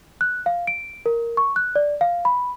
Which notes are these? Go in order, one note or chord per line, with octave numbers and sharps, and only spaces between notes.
F#6
F5
D7
A#4
C#6
F#6
D5
F5
B5